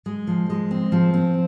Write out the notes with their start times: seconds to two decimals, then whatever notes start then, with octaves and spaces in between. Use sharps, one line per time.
0.06 G#3
0.27 F3
0.50 G#3
0.71 C4
0.92 F3
1.14 C4